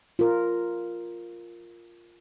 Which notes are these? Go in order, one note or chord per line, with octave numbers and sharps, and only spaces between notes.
F4 A#4